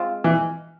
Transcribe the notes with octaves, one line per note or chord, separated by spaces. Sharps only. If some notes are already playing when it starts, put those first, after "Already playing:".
Already playing: G#3 C4 F4
E3